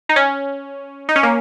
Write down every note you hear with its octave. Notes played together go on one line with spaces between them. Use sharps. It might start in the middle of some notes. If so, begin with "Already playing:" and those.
D#4
C#4
D#4
C#4
A#3